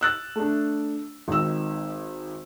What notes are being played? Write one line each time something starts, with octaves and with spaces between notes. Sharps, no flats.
E6 F#6 A6
A3 D4
G#1 D#3 E6